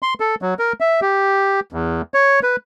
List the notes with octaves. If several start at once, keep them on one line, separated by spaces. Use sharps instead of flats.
C6
A4
F#3
A#4
E5
G4
E2
C#5
B4